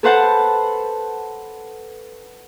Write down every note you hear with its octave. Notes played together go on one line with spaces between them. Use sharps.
A4 B4 C5 F#5 A5